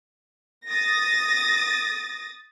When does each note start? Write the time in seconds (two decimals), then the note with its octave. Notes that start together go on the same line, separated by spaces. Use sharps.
0.69 D#6 A6 A#6